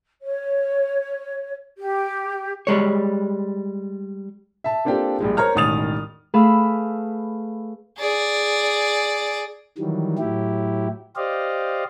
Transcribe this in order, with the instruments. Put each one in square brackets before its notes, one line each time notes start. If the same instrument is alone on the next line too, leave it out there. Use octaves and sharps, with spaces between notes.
[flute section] C#5
G4
[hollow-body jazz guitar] G3 G#3 C#5
[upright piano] E5 A5
A#3 C4 D4 F4 G4 A4
A#1 G3 G#3
A#4 C5 C#5 A#5 F6
E1 A1 D#3 D#6 A6 F7
[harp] A3 G#4 B4 F5 B5 E6
[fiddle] G#4 D5
[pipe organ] D#3 E3 F#3 G3
A2 F#3 E4 G4
G4 C5 D5 D#5 F5